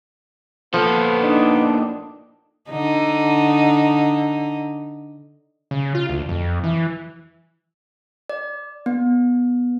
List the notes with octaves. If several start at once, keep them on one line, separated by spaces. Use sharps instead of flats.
A#2 F3 B3 A4
D4 D#4
D3 D#4
C#3
F4
D2
F2
E3
D5
B3